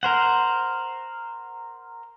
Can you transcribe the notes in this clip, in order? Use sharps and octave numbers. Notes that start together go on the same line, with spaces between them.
A#4 C5 F#5